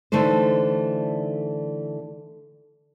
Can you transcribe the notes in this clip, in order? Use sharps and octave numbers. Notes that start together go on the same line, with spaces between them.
D3 E3 A3 D#4 C5